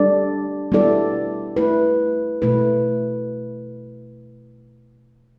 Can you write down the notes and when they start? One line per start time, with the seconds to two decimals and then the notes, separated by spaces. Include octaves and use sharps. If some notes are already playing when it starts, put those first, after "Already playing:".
Already playing: G3 D4 A4 D5
0.72 G3 B3 E4 A4 D5
1.56 A3 E4 B4
2.42 B2 A3 E4 B4